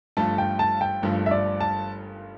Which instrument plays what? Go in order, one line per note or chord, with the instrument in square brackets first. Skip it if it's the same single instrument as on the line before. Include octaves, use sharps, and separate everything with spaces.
[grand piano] G1 G2 F3 A3 [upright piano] A5
[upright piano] G5
A5
G5
[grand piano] G1 G2 F3 A3
[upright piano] E5
D5
A5